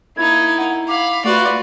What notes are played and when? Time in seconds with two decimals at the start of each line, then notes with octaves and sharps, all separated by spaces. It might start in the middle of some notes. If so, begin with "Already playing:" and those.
0.17 A#3 D#4 E4 G#6
0.58 F#5
0.88 F5 B5 D6
1.25 A3 F4 F#4 B4 D5